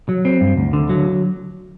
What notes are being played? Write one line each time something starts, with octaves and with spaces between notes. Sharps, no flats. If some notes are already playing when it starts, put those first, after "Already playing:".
F#3
C4
G2
D2
D3
F#3